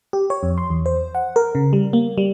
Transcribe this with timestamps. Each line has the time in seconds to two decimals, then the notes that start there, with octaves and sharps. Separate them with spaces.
0.13 G4
0.30 C#5
0.43 F2
0.58 C6
0.70 E2
0.86 C5
1.15 F#5
1.36 A#4
1.55 C#3
1.73 G3
1.93 A#3
2.18 G3